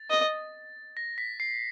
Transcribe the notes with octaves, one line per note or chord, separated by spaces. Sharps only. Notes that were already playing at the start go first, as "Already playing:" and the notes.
Already playing: A6
D#5
A#6
B6
C7